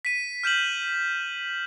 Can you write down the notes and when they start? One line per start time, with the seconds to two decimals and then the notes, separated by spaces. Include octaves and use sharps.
0.05 B6 D#7
0.43 F6 G6 E7 F#7